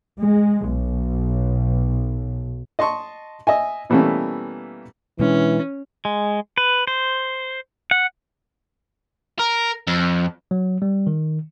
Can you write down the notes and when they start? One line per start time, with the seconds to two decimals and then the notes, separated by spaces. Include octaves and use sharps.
0.21 G#3
0.67 B1
2.79 D#5 A5 C6 C#6
3.47 D#5 E5 G#5
3.90 B2 E3 G3 A3 A#3 C#4
5.19 B2 E3 G#3 C#4 D4
6.05 G#3
6.58 B4
6.87 C5
7.91 F#5
9.40 A#4
9.87 F2
10.51 F#3
10.82 G3
11.07 D#3